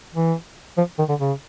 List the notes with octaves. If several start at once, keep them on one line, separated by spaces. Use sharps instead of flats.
E3
F3
D#3
D3
C#3